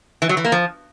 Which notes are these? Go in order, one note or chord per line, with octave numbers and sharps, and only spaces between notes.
E3
F#3
E3
A#3
F3